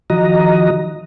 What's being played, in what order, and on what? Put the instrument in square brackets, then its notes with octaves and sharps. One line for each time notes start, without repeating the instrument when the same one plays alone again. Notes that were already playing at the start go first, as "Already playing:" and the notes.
[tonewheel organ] D#3 F3 F#4 D#5 A#5